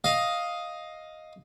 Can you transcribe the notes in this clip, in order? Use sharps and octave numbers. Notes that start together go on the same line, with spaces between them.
D#5 F5